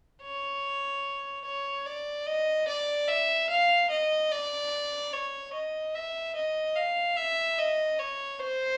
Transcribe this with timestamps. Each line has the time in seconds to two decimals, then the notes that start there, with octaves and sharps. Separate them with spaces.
0.22 C#5
1.45 C#5
1.86 D5
2.27 D#5
2.68 D5
3.08 E5
3.50 F5
3.90 D#5
4.32 D5
5.13 C#5
5.53 D#5
5.95 E5
6.36 D#5
6.76 F5
7.17 E5
7.59 D#5
7.99 C#5
8.40 C5